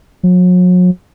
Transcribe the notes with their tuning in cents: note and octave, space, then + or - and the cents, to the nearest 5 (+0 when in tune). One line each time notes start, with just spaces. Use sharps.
F#3 -40